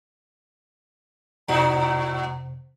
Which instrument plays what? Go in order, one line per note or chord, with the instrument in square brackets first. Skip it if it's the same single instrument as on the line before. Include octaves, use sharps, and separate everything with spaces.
[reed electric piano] F2 C3 C5 [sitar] G#2 D#4 F#4 [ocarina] A#5